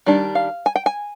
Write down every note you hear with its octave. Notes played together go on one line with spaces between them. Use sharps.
D#3 G3 D4
F5
G#5
G5
G#5